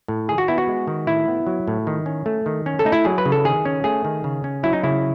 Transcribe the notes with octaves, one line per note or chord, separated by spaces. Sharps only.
A2
D#3 G#4
F#4
B3 E4
F#4
G#3
D#3
A2 E4
B3
F#3
A2
D#3
C#4
A3
D#3
C#4
A4
A3 D#4
E4
F#3 G#4
B4
C#3
A4
D#3 G#4
C#4
A3 G#4
D#3
C#3
C#4
F#3 E4
D#4
C#3 E4